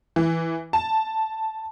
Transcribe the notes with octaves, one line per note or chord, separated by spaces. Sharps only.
E3
A5